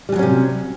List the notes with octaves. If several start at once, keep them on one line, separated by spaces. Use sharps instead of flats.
C3 E3 F#3 G3 C#4